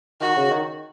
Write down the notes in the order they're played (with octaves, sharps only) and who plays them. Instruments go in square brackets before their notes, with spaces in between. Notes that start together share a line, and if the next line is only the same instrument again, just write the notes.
[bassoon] D#3 [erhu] F#4
[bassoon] C#3
D#3